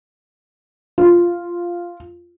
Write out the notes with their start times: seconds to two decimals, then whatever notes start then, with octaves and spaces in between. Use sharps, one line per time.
0.98 F4